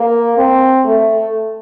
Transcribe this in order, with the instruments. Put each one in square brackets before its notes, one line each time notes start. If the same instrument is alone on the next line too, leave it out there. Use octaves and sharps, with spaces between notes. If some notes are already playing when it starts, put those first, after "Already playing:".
Already playing: [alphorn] A#3
C4
A3